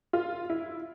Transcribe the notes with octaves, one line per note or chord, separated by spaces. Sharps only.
F4
E4